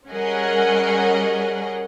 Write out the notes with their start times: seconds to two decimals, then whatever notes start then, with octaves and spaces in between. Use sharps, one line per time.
0.11 G3 C#4 G#4 A#4 D#5 F#5